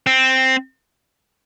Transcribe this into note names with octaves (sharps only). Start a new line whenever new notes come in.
C4